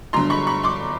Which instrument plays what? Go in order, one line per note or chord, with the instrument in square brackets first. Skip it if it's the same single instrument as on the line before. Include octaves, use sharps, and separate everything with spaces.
[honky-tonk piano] G1 G2 D3 F#3 A#5 C6
B5 C#6
B5 C#6
C6 D6